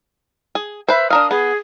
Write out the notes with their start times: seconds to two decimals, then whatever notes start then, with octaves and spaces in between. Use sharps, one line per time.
0.55 G#4
0.88 B4 C5 E5
1.10 D4 A#4 F5 D#6
1.31 B3 G#4